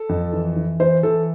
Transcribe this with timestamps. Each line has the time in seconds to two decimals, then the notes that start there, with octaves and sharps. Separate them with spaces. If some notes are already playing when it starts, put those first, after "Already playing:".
Already playing: A4
0.09 F2
0.33 E3
0.56 E3
0.80 E3 C5
1.03 E3 A4